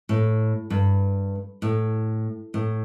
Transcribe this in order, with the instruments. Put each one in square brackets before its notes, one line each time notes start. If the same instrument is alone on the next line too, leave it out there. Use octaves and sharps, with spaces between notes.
[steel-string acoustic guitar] A2
G2
A2
A2